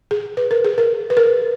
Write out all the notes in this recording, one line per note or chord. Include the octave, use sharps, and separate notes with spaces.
G#4
B4
A#4
G#4
A#4
B4
A#4